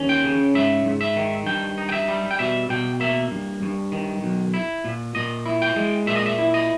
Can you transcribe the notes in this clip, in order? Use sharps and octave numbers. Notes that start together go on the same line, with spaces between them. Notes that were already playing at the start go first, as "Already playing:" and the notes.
Already playing: D#2 C#4
G5
C#3
G#2 E5
G#2
E5
D#3
G2 G5
D#4
G5
E5
G3
G5
B2 E5
B2 G5
A#3 E5
G2
G2
D#3
B1
E4
A#2
A#2 D#5
E4
G5
G#3
A#2 E5
D#5
E5
E4
D#5